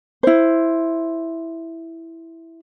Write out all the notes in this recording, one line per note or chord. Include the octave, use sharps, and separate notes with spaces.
E4 C5